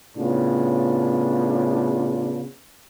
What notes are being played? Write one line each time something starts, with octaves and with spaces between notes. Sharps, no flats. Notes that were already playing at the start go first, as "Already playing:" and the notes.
A2 C#3 B3 D4 F4